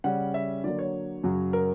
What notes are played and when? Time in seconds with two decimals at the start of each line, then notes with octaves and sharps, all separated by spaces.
0.04 C#3 G3 C#4 F#5
0.34 E5
0.64 D3 F#3 A#3 D5
0.79 C#5
1.24 F#2 C#3 F#3
1.53 A#4